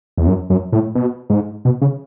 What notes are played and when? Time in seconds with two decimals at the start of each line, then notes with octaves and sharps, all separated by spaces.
0.17 E2
0.27 F#2
0.50 F#2
0.72 A2
0.95 B2
1.30 G#2
1.65 B2
1.82 C#3